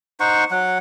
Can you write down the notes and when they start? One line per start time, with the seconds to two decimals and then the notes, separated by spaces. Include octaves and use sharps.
0.20 D#4 C5 F#5 C#6
0.51 F#3 F#5